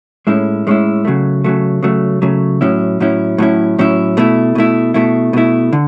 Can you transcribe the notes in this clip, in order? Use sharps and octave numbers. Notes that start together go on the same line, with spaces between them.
A2 G#3 C#4 E4
A2 G#3 C#4 E4
C#3 F#3 A3
C#3 F#3 A3
C#3 F#3 A3
C#3 F#3 A3
A2 F#3 C#4 E4
A2 F#3 C#4 E4
A2 F#3 C#4 E4
A2 F#3 C#4 E4
B2 A3 E4
B2 A3 E4
B2 A3 E4
B2 A3 E4
D3